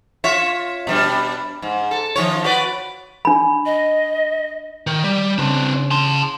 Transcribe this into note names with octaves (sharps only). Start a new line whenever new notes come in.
F4 C#5 E5
B2 G3 D4
G#2
A4
D#3 F3 C#5
F#4 B4 D5
D4 B5
D#5
D#3
G3
C#3 C4 D4
A5 C6